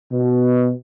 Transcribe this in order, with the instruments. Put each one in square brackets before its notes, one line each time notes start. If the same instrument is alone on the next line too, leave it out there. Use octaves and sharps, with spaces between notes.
[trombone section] B2